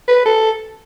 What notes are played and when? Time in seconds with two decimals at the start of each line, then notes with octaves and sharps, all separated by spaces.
0.08 B4
0.26 A4